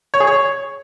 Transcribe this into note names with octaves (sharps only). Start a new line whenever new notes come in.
C#5
G#4
C#5